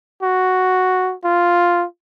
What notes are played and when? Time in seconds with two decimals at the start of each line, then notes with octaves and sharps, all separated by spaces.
0.23 F#4
1.24 F4